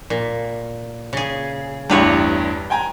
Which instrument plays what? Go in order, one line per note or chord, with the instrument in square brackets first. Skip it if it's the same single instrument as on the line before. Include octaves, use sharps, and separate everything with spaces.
[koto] A#2
C#3 G#4
[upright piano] A1 E2 G2 [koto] G3 B4 C#5
[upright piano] G5 G#5 A#5